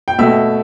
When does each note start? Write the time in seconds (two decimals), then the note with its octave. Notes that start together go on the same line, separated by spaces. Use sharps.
0.08 G5
0.18 B2 A3 E5